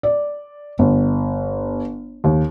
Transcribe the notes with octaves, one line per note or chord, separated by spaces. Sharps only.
D5
G1
D#2